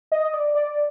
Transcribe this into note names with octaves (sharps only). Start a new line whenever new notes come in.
D#5
D5
D5